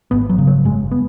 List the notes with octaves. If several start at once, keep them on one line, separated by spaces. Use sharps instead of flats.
G#1 B3
F#3
C#3
F#3
F#1 G#3
B3